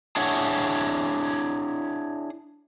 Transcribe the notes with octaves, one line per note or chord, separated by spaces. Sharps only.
D4 E4 G#4 C#5 F#5